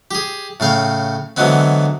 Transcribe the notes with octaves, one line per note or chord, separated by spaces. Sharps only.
G4 G#4
A2 C#3 F5 G5
D3 E3 F#3 G#3 B3 C4